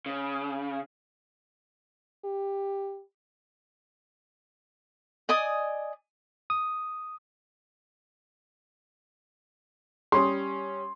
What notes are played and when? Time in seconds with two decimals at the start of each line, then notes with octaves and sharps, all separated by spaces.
0.06 C#3
2.25 G4
5.29 D5 D#5 G#5 D#6
6.50 D#6
10.12 G3 C#4 C6 D#6